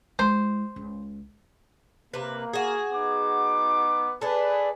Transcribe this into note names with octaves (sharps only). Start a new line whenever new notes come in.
G#3 E4 C5
C#2
C3 A#3 B4
F#4 G#4
B3 D#4 D6
D4 G#4 A4 B4